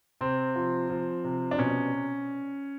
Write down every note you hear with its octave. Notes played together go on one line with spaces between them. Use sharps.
C3 C4
F3
F3
C3
D4
B2 C#4